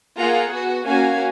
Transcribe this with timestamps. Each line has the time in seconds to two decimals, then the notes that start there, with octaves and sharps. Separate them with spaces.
0.18 A#3 F4 G#4 F#5 A#5
0.52 B3 F#4
0.86 A#3 C#4 F#4 F5 G#5